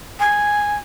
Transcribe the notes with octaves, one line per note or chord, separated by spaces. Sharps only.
G#5